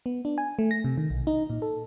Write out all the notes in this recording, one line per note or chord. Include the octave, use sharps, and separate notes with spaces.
B3
D4
G#5
A3
A#6
C3
D#3
B1
D#4
A#2
A4